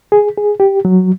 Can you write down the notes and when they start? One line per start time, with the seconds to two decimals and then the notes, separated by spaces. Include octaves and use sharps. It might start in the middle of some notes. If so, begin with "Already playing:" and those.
0.12 G#4
0.37 G#4
0.60 G4
0.85 F#3